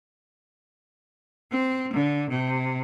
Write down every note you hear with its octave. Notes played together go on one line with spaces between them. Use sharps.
C4
D3
C3